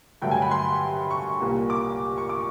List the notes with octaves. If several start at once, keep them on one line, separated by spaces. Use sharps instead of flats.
G2 D3 F#3 A3 G5
G#5
B5
C6
C#6
C2 A#2 G3 A#3
D6
C#6
D6